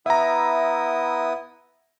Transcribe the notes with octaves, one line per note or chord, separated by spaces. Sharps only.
B3 E4 E5 A#5 D#6